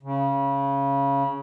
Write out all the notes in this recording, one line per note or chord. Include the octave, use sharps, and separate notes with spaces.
C#3